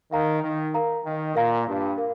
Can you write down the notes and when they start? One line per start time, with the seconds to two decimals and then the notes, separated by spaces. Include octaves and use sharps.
0.12 D#3 A#4 F5 A#5
0.43 D#3
0.74 A#4 F5 A#5
1.05 D#3
1.35 A#2 A#4 F5 A#5
1.67 G2
1.98 A#4 F5